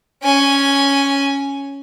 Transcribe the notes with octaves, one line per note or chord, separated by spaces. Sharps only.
C#4 G#5